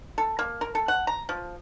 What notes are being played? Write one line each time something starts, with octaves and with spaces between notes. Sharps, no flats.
A4
A#3
A#4
A4
F#5
A#5
F3